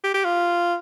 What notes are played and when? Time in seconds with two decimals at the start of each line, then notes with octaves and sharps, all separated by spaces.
0.04 G4
0.14 G4
0.24 F4